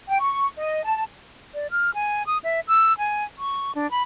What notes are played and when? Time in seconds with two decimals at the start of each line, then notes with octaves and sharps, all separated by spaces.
0.09 G5
0.20 C#6
0.57 D#5
0.84 A5
1.54 D5
1.71 F6
1.94 G#5
2.26 D#6
2.44 E5
2.68 E6
2.98 G#5
3.38 C#6
3.75 D4
3.91 B5